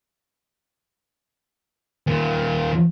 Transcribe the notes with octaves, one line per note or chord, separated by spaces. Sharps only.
D#2 A#2